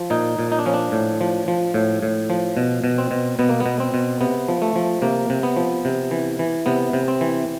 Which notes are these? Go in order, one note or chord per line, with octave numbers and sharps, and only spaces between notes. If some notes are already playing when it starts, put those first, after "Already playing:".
Already playing: F3
A#2 D#4
A#2
D#4
D4
F3 C#4
D4
A2
F3
F3
A2
A2
F3
B2
B2
C4
B2
B2 B3
A#3
B3
B2
C4
B2
C3 B3
F3
A3
F3
C3 A#3
C3
B3
F3
C3
E3
E3
C3 B3
C3
C4
E3